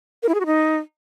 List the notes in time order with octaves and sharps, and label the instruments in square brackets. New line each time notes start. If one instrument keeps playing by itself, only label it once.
[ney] A#4
E4
G#4
F#4
D#4